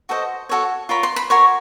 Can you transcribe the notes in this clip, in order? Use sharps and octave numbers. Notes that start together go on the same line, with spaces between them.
F#4 A4 C5 D#5
F#4 A4 C#5
F4 A#4 C#5 B5
C6
B5
F#4 A#4 C#5 C6